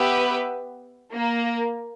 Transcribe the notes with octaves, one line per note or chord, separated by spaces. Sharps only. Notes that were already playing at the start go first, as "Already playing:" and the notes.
Already playing: B3 G4 B4 E5
A#3